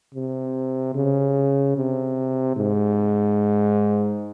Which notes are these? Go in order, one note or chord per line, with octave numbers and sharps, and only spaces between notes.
C3
C#3
C3
G#2